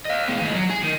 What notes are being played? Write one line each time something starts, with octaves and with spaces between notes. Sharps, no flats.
D#5 F5
B2 G#3
D#2 G#3
F#3
G#4
D#3